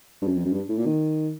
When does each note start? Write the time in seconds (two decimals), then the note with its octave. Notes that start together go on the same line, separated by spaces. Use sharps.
0.22 G2
0.27 F#2
0.36 F2
0.45 F#2
0.52 G2
0.69 A2
0.78 A#2
0.86 D#3